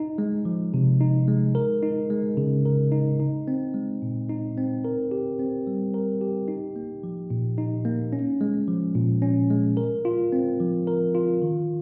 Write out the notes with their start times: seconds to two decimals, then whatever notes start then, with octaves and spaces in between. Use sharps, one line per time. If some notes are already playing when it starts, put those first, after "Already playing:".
Already playing: D#4
0.18 G#3
0.45 F3
0.74 C3
1.01 D#4
1.28 G#3
1.55 A#4
1.83 D#4
2.10 G#3
2.37 C#3
2.65 A#4
2.92 D#4
3.20 D#4
3.48 C4
3.74 G#3
4.02 A#2
4.29 D#4
4.57 C4
4.84 A#4
5.11 G4
5.39 C4
5.67 G3
5.94 A#4
6.21 G4
6.48 D#4
6.76 A#3
7.03 F3
7.30 A#2
7.58 D#4
7.85 A#3
8.13 C#4
8.41 G#3
8.68 F3
8.95 A#2
9.22 C#4
9.50 G#3
9.77 A#4
10.05 F4
10.32 C4
10.60 F3
10.87 A#4
11.15 F4
11.42 D#3